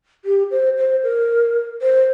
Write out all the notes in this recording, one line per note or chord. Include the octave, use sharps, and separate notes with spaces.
G4
C5
C5
A#4
C5